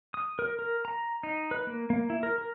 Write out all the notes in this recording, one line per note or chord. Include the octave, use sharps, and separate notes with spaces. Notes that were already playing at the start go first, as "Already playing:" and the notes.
D#6
A#4
A#4
A#5
D#4
B4
A#3
A#3
E4
A#4
A#4